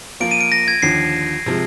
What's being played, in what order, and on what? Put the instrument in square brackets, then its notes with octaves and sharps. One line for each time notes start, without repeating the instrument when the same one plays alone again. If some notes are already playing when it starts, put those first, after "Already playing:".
[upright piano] F3 A#3 F4 [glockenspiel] D7
[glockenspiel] D#7
D7
A#6
G#6
[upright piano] D#2 D3 F3 [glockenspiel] C7
[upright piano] C3 F3 G#3